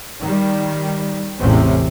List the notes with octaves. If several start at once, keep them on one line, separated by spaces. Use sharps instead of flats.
D#3 G3
A1 E2 A2 C3 C4 C#4